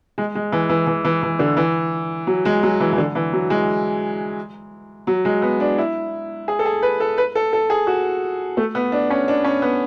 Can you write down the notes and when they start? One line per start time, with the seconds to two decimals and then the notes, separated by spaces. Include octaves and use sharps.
0.18 G#3
0.35 G#3
0.52 E3
0.69 E3
0.87 E3
1.04 E3
1.23 E3
1.39 D3
1.57 E3
2.27 F#3
2.45 G#3
2.63 F#3
2.80 E3
2.92 E3
2.98 D3
3.15 E3
3.33 F#3
3.50 G#3
5.07 F#3
5.25 G#3
5.42 B3
5.60 D4
5.78 E4
6.48 G#4
6.59 A4
6.66 G#4
6.82 B4
7.00 A4
7.18 B4
7.35 A4
7.53 A4
7.70 G#4
7.87 F#4
8.57 A3
8.75 B3
8.92 D4
9.10 C#4
9.28 D4
9.45 C#4
9.62 B3